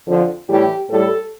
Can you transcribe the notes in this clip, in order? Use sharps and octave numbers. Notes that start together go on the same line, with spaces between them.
F2 D3 F3
A2 E3 G3 G4
A2 G3 A4